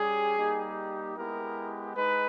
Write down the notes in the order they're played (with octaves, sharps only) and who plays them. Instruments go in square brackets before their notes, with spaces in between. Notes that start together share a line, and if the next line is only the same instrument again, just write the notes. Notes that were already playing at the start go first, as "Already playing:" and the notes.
Already playing: [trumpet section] G3 C#4 G4 G#4
G3 A#3 D#4 G4
G#3 B3 E4 G4 A#4
G#3 D#4 B4